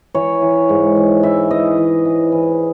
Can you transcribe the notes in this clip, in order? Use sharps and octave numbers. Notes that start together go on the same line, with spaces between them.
E3 C#5
E3
G#2
E3
E3 E5
E3 D#5
E3
E3
E3